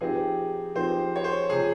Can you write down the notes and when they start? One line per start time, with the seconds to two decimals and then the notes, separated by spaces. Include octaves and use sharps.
0.01 F3 C4 D#4 G4 G#4
0.75 F3 C4 D#4 G4 C5
1.16 C#5
1.24 C5
1.50 C3 F3 G#4